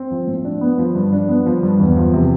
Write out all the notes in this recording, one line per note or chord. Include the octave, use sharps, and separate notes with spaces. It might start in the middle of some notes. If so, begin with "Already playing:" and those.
Already playing: C4
F3
A2
D4
B3
F3
G2
D4
B3
F3
G2
E2
F3
C3